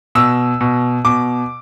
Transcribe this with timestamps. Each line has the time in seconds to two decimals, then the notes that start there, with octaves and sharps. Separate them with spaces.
0.15 B2 E6
0.61 B2
1.05 B2 D6